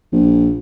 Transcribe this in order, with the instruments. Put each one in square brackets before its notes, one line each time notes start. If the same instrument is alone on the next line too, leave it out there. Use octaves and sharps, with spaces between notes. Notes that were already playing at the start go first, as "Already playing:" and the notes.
[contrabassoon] A#1